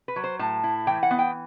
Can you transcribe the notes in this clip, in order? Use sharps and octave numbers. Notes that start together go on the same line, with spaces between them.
B4
F#3
C5
A2 A5
E4
E3 G5
F#5
B3
G5